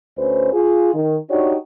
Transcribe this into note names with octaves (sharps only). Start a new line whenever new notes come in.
D2 C#4 B4 C5
F4 G#4
D#3
D4 D#4 F#4 G4 C#5 D5